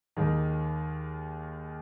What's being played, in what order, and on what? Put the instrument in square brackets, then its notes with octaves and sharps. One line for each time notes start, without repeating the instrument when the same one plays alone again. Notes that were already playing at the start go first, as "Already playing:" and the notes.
[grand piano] D#2 D#3 G#3